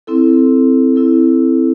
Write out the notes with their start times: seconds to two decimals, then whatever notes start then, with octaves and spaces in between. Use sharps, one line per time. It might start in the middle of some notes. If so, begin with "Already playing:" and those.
0.07 C4 E4 A4
0.96 C4 E4 A4